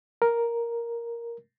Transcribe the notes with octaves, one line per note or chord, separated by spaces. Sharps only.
A#4